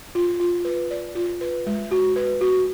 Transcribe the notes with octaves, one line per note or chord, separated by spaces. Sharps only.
F4
F4
B4
D5
F4
B4
G#3
F#4
B4
F#4